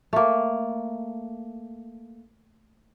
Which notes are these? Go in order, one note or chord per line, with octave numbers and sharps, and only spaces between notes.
A3 A#3